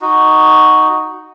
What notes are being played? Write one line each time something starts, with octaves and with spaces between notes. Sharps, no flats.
D#4 F#4